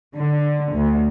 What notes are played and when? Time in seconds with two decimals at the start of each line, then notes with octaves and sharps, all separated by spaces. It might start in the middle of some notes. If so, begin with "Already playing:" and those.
0.15 D3
0.73 D2